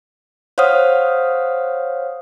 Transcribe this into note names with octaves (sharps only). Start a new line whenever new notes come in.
C5 C#5 F5 F#5 D#6 F6